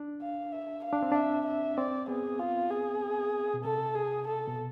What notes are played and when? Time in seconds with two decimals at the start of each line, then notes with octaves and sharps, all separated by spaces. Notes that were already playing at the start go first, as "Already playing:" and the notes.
Already playing: D4
0.22 F5
0.53 E5
0.84 F5
0.93 D4
1.02 C4
1.12 D4 E5
1.46 E5
1.77 C4 D5
2.08 B3 G#4
2.39 F4
2.71 G#4
3.54 B2
3.64 C3 A4
3.95 G#4
4.27 A4
4.47 B2